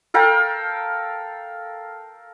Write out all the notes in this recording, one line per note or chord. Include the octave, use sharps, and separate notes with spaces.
A4 A#4 F5 G5